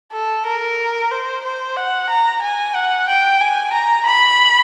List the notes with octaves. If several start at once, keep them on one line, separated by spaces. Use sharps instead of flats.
A4
A#4
C5
C5
F#5
A#5
G#5
F#5
G5
G#5
A#5
B5